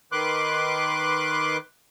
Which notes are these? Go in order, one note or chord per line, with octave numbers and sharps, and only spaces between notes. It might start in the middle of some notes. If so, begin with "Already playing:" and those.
D#3 B4 C6 D6 F#6